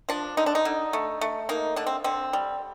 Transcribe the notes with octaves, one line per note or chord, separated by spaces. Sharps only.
F3 D4
D3 D#4
D4
D#4
D3
A3
A3
A#3 D#4
D3 D4
C4
D3 C4
G3